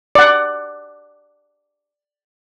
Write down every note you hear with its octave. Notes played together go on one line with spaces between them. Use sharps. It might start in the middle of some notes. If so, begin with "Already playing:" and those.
D5 F#5